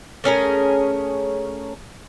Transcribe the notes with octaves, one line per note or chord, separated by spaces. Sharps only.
A3 C#4 G#4 A#4